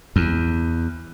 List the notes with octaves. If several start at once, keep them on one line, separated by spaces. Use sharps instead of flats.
E2